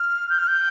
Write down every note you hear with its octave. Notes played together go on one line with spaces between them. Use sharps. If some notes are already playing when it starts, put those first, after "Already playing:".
Already playing: F6
G6
F6
G6